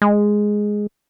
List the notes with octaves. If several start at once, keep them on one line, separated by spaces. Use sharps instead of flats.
G#3